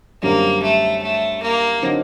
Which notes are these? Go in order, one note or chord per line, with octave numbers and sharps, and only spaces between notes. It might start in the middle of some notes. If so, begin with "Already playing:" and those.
F#2 D3 G3 A#3 C4
A3
A3
A#3
D3 F#3 C4 D#4